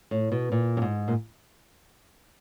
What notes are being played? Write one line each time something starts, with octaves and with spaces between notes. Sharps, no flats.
A2
B2
A#2
G2
G#2
A#2